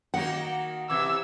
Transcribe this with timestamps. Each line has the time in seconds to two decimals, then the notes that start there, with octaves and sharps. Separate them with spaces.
0.14 D#3 A#3 F#4 F#5
0.90 C3 E3 D6 E6 G#6